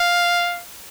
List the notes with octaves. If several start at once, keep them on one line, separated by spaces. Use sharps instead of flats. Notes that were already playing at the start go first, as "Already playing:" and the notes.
Already playing: F5